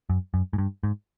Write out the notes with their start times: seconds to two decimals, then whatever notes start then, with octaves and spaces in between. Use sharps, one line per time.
0.10 F#2
0.34 F#2
0.53 G#2
0.58 G2
0.83 G#2